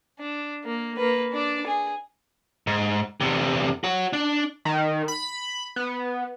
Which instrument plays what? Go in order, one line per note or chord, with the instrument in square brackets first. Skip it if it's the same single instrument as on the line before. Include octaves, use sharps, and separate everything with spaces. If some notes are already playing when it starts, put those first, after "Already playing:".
[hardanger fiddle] D4
A#3
A#3 B4
D4 D5
G#4
[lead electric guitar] G#2
E2 C3
F#4 C#5
D4
[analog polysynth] D#3
B5
B3